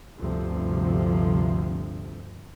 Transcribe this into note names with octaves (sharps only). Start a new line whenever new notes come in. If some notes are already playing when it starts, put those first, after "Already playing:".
G1 D2 C3 F3